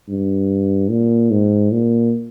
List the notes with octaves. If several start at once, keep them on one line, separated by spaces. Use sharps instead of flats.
G2
A#2
G#2
A#2